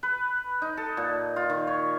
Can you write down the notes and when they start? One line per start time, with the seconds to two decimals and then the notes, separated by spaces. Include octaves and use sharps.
0.03 B4
0.62 D#4
0.77 A4
0.97 A#2
1.36 F4
1.50 D#3
1.67 C#5